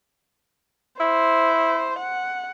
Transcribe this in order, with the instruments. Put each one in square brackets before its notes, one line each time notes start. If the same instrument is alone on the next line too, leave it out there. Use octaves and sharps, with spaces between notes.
[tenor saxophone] E4 [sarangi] C5
[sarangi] F#5